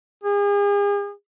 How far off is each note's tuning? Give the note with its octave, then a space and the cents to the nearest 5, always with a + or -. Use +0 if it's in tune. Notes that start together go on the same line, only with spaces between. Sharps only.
G#4 -40